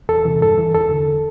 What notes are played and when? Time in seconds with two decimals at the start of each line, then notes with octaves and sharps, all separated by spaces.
0.09 E2 A4
0.25 C3 E3
0.41 G2 A4
0.58 E3
0.74 E2 A4
0.91 D3